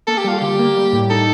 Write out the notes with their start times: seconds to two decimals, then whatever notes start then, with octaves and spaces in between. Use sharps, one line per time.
0.07 A#3 A4
0.18 G4
0.24 G3 F4
0.38 D3 G4
0.59 A#3
0.76 G3
0.93 A2
1.10 D#4 A4